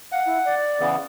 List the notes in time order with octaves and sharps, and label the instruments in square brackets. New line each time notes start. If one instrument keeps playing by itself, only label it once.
[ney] F5 [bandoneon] F#5
[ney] E4
D5
[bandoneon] C#3 E3 B3